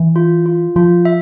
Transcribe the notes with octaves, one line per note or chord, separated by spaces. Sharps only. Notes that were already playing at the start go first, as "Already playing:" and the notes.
Already playing: E3
F4
F4
F3 F4
E5